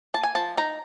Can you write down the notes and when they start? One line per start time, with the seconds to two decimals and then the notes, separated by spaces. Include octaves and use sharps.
0.14 A#3 A5
0.23 G#5
0.35 F3 A5
0.57 D#4 A#5